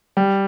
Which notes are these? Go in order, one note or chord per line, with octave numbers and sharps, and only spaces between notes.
G3